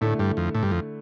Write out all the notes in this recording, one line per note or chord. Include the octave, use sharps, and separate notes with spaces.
A2 D3 A3 E4
G2
F2
A2
G2
F2